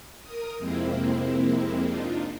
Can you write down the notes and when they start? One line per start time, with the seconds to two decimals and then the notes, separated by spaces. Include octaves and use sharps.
0.23 A#4 D#6
0.57 F2 C3 G#3 A#3 C4 E4
1.83 D4 D#4 F4